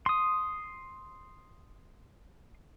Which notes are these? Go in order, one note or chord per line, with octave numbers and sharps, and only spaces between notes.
C6 D#6